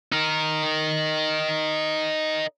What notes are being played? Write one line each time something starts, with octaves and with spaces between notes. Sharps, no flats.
D#4 A#4